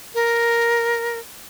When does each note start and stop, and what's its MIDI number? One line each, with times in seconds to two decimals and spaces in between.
0.15 1.19 70